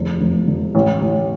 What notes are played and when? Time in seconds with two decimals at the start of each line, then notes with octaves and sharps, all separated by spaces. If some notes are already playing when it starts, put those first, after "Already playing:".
Already playing: F1 E2 F3
0.21 F1
0.48 F1
0.75 A1
1.02 A1